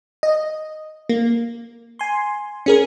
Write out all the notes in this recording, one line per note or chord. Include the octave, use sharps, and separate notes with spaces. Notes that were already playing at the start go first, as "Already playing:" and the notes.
D#5
A#3
G#5 C6
C#4 G#4 A#4